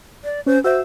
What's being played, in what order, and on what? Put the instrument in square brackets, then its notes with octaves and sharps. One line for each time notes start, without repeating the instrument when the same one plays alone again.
[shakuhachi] D5
[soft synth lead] C#4 [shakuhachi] C5
[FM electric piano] F#4 E5 [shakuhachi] C5 [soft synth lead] E6